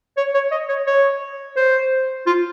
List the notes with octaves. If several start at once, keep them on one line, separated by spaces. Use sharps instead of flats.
C#5
C#5
D#5
C#5
C#5
C5
F4